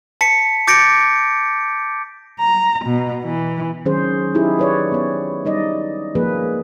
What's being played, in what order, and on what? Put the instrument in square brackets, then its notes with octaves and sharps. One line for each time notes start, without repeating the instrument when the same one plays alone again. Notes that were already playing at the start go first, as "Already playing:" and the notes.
[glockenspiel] A5 B6 C#7
D6 G6 A6 A#6 C#7 D7
[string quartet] A#5
B2
E3
[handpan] D#3 F#3 C#4 G#4 C5
D#4 E4 G4 G#4
B4 C#5 D5
B3 C#5
G3 D#4 D5 D#5
F3 A#3 G#4 B4